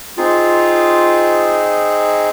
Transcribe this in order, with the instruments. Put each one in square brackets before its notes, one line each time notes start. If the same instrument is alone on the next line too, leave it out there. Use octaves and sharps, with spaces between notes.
[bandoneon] C4 D#4 G#4 [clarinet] F4